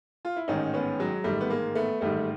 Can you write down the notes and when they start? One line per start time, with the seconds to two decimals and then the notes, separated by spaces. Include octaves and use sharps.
0.25 F4
0.36 E4
0.48 A1 G#2 D#3 C#4 D#4
0.74 B3 C#4
0.99 F#3 G#3
1.24 A1 G#2 D#3 G3 A3
1.41 B3
1.50 G#3 A#3
1.75 A3 B3
2.01 A1 G#2 D#3 G3 A3